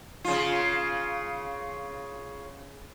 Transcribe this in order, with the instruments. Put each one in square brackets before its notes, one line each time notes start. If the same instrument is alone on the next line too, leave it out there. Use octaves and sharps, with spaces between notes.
[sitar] C#3 F4